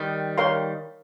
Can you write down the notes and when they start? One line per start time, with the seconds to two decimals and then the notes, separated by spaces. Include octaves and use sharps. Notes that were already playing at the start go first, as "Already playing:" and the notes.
Already playing: D#3 G3
0.38 A#4 C#5 F5 C6